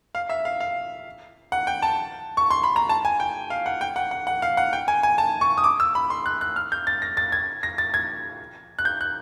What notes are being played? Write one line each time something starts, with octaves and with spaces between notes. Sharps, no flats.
F5
E5
F5
F5
F#5
G5
A5
C#6
C6
B5
A#5
A5
G#5
G5
F5
F#5
G5
F#5
F#5
F#5
F5
F#5
G5
G#5
G#5
A5
C#6
D#6
D6
E6
B5
C6
F#6
F#6
F6
G6
A6
A#6
A6
G#6
A#6
A6
G#6
F#6
G6
F#6